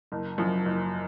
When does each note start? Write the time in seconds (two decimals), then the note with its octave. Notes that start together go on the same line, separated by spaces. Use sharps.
0.12 F#1
0.38 F#2 F3
0.65 F#1